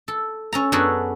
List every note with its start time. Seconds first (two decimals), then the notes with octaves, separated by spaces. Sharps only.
0.08 A4
0.53 C#4 A4 A#5
0.72 F#2 B3 D4 F#4 G#4 A4